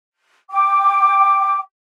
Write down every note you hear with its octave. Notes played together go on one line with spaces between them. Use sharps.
G5 D6